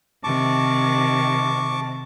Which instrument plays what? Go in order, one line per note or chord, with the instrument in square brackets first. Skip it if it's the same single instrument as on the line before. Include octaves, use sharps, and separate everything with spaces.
[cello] C3 D#3 [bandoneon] A5 C#6 D6